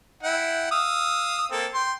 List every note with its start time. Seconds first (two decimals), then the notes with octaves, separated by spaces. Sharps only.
0.23 E4 F#5 G5
0.71 F5 D#6 E6
1.51 A#3 C4 A4
1.74 G5 C6